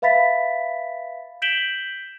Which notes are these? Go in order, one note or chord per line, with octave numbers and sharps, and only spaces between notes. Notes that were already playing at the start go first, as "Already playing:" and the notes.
B4 E5 F5 B5 A6 B6
G6 B6 D7 E7 F#7 G7